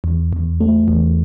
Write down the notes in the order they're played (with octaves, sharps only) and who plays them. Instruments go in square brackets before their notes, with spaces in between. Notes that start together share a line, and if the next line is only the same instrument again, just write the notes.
[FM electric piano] E2
E2
A3
E2